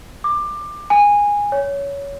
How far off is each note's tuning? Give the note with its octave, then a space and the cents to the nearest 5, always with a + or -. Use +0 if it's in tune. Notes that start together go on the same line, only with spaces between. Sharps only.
D6 +20
G#5 -15
C#5 +15